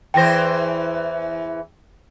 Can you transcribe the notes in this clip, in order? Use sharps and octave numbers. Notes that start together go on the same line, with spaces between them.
E2 E3 C5 G5 A#6